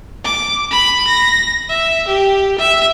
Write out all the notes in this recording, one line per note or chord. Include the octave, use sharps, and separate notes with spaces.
D6
B5
A#6
E5
G4
E5